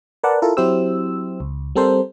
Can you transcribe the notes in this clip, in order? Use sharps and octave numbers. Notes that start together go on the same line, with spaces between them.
A#4 B4 D5 F#5 A5
E4 F4 A4 A#4
F#3 C4 E4 G4 C5 E6
C#2
G3 C4 A4 A#4 C5